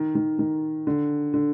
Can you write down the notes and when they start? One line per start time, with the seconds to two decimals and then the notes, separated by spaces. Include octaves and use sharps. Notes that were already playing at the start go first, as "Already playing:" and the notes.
Already playing: D#3
0.15 D#3
0.39 D#3
0.87 D3
1.34 D3